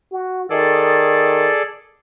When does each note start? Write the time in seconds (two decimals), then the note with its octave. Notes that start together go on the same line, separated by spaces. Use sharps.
0.12 F#4
0.50 D#3 G#4 A4 D5